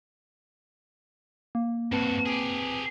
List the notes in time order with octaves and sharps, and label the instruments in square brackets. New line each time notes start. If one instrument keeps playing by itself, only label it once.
[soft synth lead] A#3
[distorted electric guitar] G2 F#4 [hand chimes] C4 B4 A5
[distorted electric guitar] G4 G#4